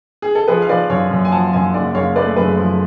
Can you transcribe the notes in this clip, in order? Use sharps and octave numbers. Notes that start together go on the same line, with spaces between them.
G#4
A4
F3 G#4 B4
F5
F3 B4 D5
F#2 C#5 F5
F#2
G#5
F3 F#5 A5
F#2 F5 G#5
F#1 D5 F#5
F#1 C#5 F5
A3 B4 D5
F#2 G#4 B4
F3